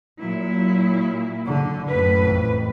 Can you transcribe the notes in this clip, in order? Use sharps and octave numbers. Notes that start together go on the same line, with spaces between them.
A#2 F#3 E4
D3
F#2 A2 B4
A1 F2